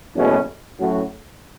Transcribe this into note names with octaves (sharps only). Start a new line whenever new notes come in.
F#1 E2 B2 A3 C#4
A2 F#3 C#4 F#4